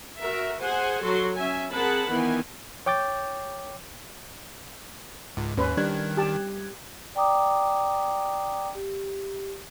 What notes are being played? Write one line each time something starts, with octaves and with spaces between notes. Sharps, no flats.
F#4 A#4 E5
G#4 C5 F#5 G#5
F#3 F#4 A4 C6
C#4 E5 G#5
C4 G#4 A#4 F#5 A5 B5
D#3 E3 B3 G#5
C#5 G5 D6 G6 A6
C#2 G#2
D#2 C#4 B4 C6
D#3 G3 D4 F#6 G#6
G4 A5
D5 G5 A#5 D6 D#6
G4